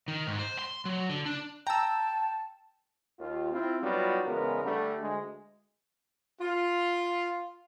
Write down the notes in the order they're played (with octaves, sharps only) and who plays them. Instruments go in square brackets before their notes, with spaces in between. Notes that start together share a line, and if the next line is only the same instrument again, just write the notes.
[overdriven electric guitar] D#3
G#2
C5
C6
F#3
D3
D4
[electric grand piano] G5 [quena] A5 [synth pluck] A#5 E6
[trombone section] D#2 F4
C4 E4 F4
F#3 G3 B3 D#4 F4 F#4
E2 C#3 G#3 B3 A#4
D3 G3 A3
D2 G#3
[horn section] F4